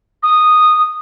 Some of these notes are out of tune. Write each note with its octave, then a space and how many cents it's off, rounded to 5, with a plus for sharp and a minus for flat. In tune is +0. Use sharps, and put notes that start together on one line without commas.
D#6 -10